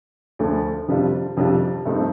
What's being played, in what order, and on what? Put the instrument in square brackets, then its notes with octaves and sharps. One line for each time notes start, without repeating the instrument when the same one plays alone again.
[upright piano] D2 D3 F3 A3
F2 C3 G3 D4 F4
F2 C3 G3 D4 F4
G2 F3 A3 C4 D#4